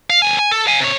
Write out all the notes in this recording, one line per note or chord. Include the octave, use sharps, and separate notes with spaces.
F5
D#2 G#5
G#5
A4
F5 G#5
C3 C#5